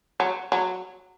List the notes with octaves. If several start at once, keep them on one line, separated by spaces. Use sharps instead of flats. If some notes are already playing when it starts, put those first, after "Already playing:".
F#3
F#3